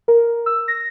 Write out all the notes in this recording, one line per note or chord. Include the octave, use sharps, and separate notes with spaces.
A#4
E6
A#6